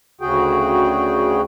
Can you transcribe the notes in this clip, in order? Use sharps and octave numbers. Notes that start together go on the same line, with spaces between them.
D2 C#3 F#4 G#4 G5